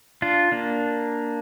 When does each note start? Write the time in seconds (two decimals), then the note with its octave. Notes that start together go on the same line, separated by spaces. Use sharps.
0.22 D4 F4
0.52 A#3 D4